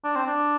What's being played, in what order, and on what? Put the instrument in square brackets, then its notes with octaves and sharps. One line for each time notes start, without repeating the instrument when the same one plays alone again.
[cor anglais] D4
C4
D4